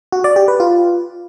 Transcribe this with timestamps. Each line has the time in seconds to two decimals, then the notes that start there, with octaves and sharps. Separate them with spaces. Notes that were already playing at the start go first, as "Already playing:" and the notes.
0.12 F#4
0.24 D5
0.36 G4
0.48 B4
0.60 F4